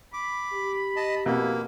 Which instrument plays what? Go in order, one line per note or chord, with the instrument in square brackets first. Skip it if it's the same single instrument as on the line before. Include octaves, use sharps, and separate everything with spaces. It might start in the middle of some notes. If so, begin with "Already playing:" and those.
[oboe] B5 [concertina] D6
[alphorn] G4
[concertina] D#5 A5
[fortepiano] F2 B2 [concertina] A#3 [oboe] E4